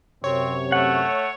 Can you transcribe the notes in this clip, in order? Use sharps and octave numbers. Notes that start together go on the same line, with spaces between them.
F#2 C3 C4 C#5
A3 F#5